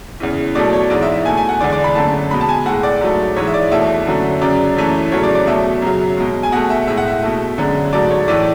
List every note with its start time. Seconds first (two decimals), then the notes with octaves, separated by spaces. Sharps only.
0.20 E2 C#3 E3
0.55 B2 F#3 A3 D5
0.73 C#5
0.90 G#2 E3 G#3 D5
1.02 E5
1.14 E5
1.25 B2 G#5
1.29 A3
1.37 G#5
1.49 F#5
1.61 E2 D3 G#3 D5
1.72 D5
1.84 B5
1.95 F#2 D3 A3 A5
2.31 B2 G#3 B5
2.41 A5
2.49 G#5
2.66 A2 G#3 F#5
2.83 D5
3.01 G#2 F#3 A3
3.36 G#2 E3 G#3 C#5
3.47 E5
3.54 D5
3.71 E2 B2 A3 E5
4.06 F#2 D3 F#3 A3
4.41 F#2 C#3 F#3 D5
4.76 F#2 E3 A3
5.12 E2 C#3 F#3 A3 C#5
5.23 D5
5.35 D5
5.47 B2 F#3 A3 E5
5.82 F#2 C#3 F#3
6.17 B2 G#3
6.43 G#5
6.52 B2 A3 F#5
6.70 E5
6.87 A2 G#3 E5
6.97 F#5
7.07 E5
7.23 B2 A3
7.58 F#2 D3 G#3
7.93 G#2 F#3 A3 D5
8.11 C#5
8.28 A2 E3 A3 D5